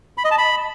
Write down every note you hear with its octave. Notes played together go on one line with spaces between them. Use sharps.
B5
D#5
A5
B5